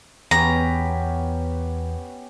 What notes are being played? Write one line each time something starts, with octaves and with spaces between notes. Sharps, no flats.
E2 B3 C#4 G4 A#5